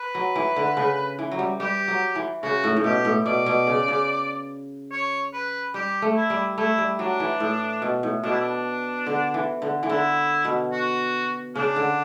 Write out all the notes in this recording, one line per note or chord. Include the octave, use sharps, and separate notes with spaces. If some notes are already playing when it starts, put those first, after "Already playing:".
Already playing: B4
F#3
E3
D3
C#3
E3
F#3
G3
G3 G4
F#3
E3
C#3 F#4
A2
A2
B2 G4
A2
B2 D5
B2
C#3
C#3
C#5
B4
G3 G4
A3
E4
G3
A3 E4
G3
F#3 D4
E3
A2
B2
A2
B2 D4
E4
D4
D3
E3
D3
E3
D3 E4
B2
F#4
C#3 D4
D3